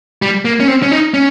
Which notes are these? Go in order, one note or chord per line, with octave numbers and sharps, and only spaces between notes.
G3
A#3
C#4
C4
C#4
D#4
C#4